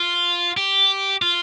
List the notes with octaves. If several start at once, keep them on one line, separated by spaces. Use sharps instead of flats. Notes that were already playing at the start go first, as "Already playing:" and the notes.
Already playing: F4
G4
F4